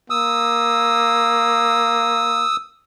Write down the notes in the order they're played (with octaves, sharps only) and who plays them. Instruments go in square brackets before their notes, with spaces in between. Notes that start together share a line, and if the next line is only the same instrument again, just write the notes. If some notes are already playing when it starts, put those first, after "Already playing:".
[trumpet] A#3 [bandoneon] D#6 E6